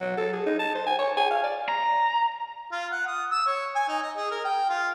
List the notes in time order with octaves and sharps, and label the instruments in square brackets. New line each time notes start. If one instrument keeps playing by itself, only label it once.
[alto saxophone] F#3
A4
G#4
D#4
A5
C5
G#5
C#5
G#5
F5
D5
[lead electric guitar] A#5
[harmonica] F4
F#5
D#6
E6
C#5
G#5
D#4
D#5
G#4
A#4
G5
F4